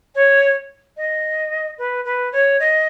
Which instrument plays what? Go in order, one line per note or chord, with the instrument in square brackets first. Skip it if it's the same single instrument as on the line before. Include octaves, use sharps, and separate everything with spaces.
[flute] C#5
D#5
B4
B4
C#5
D#5